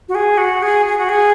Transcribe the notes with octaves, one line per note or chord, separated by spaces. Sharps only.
F#4
G#4
F#4
G#4
G#4
F#4
G#4